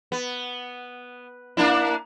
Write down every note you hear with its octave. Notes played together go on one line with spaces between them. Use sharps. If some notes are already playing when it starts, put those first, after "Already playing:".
B3
A#3 D4 E4